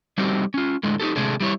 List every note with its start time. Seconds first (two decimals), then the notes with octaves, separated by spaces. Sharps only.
0.18 G3 A3 C4 D#4 F#4 G4
0.54 C#4 F4
0.83 A2 D3 G#3
1.00 D#4 E4 G4 A4
1.16 C3 G#3 A3 D4 G#4 A4
1.40 G3 E4 C#5